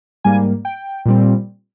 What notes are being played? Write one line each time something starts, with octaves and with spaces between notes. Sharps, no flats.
G#2 G3 A#3 G#5
G5
A#2 G3 C4